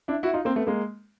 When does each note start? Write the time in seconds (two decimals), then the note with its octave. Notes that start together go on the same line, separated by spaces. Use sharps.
0.08 D4 E4
0.23 E4 F#4
0.33 D#4 F4
0.45 A#3 C4
0.56 A3 B3
0.67 G#3 A#3